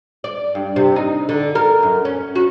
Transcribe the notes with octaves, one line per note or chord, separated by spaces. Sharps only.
D5
G2
C3
D#4
D3
A#4
F#2
C#4
F#4